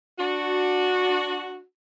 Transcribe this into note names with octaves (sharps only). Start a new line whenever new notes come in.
D4 F#4